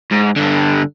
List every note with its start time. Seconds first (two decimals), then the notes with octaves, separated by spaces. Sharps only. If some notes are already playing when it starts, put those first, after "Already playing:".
0.12 G#2
0.36 G2 D3